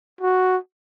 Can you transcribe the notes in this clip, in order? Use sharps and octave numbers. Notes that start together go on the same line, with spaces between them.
F#4